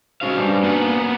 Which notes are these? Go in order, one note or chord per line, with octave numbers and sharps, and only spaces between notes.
G#3 C#4 D#4 F#4 C5 F5
G3 D4 B4 G#5
A#3 B3 F#5